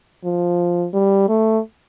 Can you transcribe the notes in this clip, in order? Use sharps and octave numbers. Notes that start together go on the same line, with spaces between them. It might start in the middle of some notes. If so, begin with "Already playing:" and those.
F3
G3
A3